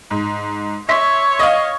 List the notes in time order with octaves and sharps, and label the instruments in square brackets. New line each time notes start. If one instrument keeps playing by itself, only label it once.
[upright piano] G#2
[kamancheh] C#5 [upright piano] E5 C6 B6
[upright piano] D#5 F5